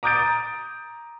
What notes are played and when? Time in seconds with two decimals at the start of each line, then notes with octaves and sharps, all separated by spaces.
0.03 A#5 D6 D#6 G6 A6 D7